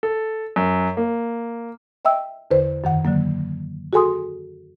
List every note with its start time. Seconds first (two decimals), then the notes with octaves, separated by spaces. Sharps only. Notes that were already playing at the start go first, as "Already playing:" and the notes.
0.03 A4
0.56 F#2
0.97 A#3
2.05 D#5 E5 G5 E6
2.51 E2 D3 B4 C5
2.84 F#2 D#3 F#5
3.05 D3 F#3 A#3
3.93 F#4 G#4 A4 G#5 C6 D#6